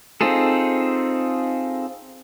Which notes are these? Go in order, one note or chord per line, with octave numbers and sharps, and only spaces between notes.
C4 D#4 F4 G#4 A4